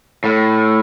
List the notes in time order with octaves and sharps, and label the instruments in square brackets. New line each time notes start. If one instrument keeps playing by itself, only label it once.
[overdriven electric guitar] A2